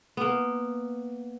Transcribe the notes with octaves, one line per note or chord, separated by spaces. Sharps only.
A#3 B3